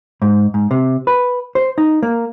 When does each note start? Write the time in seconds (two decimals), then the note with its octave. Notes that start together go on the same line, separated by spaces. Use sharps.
0.22 G#2
0.54 G#2
0.71 C3
1.07 B4
1.55 C5
1.78 D#4
2.03 A#3